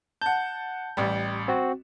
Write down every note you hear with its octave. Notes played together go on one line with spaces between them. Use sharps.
F#5 A5 G6
A1 G3
C4 F#4